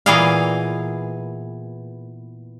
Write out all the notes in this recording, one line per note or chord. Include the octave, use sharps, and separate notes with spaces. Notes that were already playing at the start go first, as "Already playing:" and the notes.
A#2 E3 B3 G#4 D#5 F5